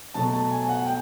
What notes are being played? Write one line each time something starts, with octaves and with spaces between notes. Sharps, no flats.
B2 F#3 A3 A5
A5
G#5
F#5
G5